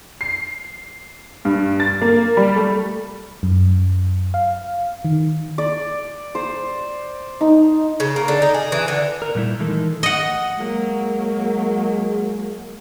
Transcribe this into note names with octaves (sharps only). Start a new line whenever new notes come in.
C7
G2
A6
A#3
G3
A3
F#2
F5
D#3
D5
C5
D#4
C#3
A#3
D3
D#4
G#4
E3
D3
A#4
A#2 G3 A3 E4
D#3 E3 G#3 D#4 A4 A#4
D#5 F#5
F#3 G#3 A#3